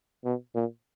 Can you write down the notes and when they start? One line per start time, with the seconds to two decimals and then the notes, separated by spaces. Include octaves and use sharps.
0.25 B2
0.55 A#2